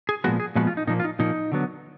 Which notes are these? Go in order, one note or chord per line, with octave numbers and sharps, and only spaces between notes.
G#4
A#2 F3 G#3 B3 F#4
G#4
A#2 F3 G#3 B3 F#4
F4
D#4
A#2 F3 A#3 D#4
F4
D#4
A#2 F3 A#3 D#4
D3 F#3 B3